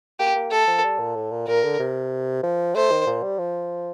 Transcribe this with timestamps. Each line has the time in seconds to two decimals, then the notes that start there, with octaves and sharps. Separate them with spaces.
0.19 A#3 G4
0.35 A#3
0.51 A3 A4
0.67 F3
0.84 G3
0.99 A#2
1.15 A2
1.31 A#2
1.47 A#2 A#4
1.63 D3
1.80 C3
2.43 F3
2.75 A3 C5
2.91 D#3
3.06 A#2
3.23 G3
3.39 F3